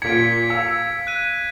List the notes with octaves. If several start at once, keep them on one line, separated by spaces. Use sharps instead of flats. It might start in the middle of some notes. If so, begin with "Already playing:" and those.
A#2 G#6 B6 C#7 D7
F5 E6 C#7
F#6 D#7